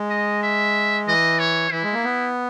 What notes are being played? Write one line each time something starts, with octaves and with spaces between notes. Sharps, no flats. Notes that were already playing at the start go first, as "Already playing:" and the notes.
Already playing: G#3
D#5
E5
E3 D#5
C#5
E3 E4
G#3
A#3
B3